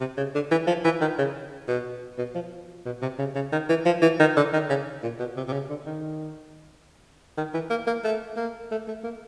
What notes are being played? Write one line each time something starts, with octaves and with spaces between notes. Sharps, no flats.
C3
C#3
D3
E3
F3
E3
D#3
C#3
B2
B2
F3
B2
C3
C#3
C#3
D#3
E3
F3
E3
D#3
D3
D#3
C#3
A#2
B2
C3
C3
C#3
D3
D#3
D#3
E3
A#3
A#3
A3
A#3
A3
A3
A#3